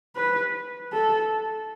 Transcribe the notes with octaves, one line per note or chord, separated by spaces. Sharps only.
B4
A4